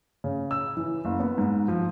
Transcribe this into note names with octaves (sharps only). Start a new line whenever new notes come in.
C#3
E6
E3
F#1
B3
G#2
F3